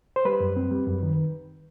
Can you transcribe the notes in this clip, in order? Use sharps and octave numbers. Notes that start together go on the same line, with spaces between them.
C5
G3 B4
F#2
C4
G3
F#2
D#3